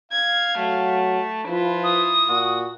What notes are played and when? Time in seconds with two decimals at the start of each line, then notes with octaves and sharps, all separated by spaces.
0.12 F5 G#6
0.58 F#3 A3
1.47 F3 E4 F4 B4
1.84 D#6
2.29 A#2 F#4